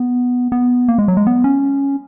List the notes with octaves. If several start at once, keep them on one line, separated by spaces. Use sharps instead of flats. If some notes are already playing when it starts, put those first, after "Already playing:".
Already playing: B3
B3
A#3
G#3
F#3
G#3
B3
C#4